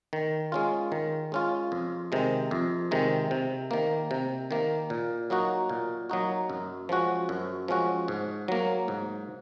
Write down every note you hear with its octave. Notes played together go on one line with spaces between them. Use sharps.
D#3
G#3 C#4 F4
D#3
G#3 C#4 F4
F2
C3 D#3 G#3
F2
C3 D#3 G#3
C3
D#3 A#3
C3
D#3 A#3
A#2
F#3 A#3 D#4 F#4
A#2
F#3 A#3 D#4 F#4
F#2
F3 G#3 C#4 F#4
F#2
F3 G#3 C#4 F#4
G#2
F#3 A#3
G#2